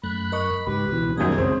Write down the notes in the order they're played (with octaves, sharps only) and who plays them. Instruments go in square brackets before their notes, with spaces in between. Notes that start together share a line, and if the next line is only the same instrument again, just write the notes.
[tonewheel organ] F#2 F#6 [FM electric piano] A3 [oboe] B5
[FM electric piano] A#4 D#5 C#6
[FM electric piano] C#2 [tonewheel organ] G#2 G4 [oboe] B4
[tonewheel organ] B2 E3
[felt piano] F#2 B2 [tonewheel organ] D#3 F3 G3 [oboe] G#4 [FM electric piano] A#4 G6
[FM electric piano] C2 F#2 [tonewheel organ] C#3 G#3 C#5 [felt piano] C4